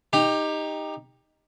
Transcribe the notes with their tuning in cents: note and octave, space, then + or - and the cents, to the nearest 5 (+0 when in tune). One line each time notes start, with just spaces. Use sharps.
D#4 +0 G4 +20